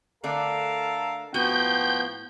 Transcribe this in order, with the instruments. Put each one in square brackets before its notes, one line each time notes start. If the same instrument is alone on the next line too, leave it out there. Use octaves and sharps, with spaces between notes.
[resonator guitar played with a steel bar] D3 A3 D4 [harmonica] A4 A#4 F5
[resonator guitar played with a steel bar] A2 F#4 G#5 [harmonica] F3 G5 [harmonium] B3 [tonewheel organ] G6